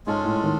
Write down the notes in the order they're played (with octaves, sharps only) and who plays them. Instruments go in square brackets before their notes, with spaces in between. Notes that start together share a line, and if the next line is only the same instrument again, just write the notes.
[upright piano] G#2 [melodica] G#3 C#4 F4 A4
[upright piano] A2
D#3